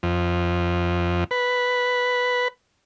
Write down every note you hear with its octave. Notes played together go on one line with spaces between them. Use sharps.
F2
B4